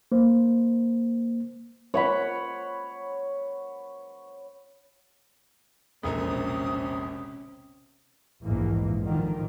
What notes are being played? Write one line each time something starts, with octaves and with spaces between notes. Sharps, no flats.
A#3 C5
C#5 F#5 B5
E1 A#1 C3 C#4 A#4 D#6
A#1 E2 G#2 E3 G#3 A#3
A#2 D3 D#3 F3